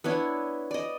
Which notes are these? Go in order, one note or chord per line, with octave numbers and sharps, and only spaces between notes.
B3 D4 E4 C#5
D5 D#5